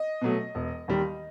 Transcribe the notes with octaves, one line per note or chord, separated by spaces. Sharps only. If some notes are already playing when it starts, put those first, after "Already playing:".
Already playing: D#5
B2 F#3 A3
E1
D#2 D#3 G3